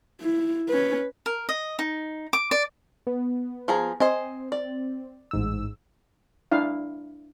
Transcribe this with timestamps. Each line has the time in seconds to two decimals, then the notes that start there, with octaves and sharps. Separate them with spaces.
0.21 E4
0.69 C#4 B4
1.26 A#4
1.49 D#5
1.79 D#4
2.33 D6
2.51 D5
3.07 B3
3.68 F3 G#4 A#5
4.00 C4 C5 D#5 G#5
4.52 D5
5.31 A1 G#2 E6
6.52 D4 E4 F5